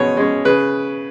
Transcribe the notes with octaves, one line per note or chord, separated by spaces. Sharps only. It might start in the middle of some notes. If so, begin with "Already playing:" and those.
Already playing: B2 G#3 C#4 C#5
G#3 C#4
C#3 B4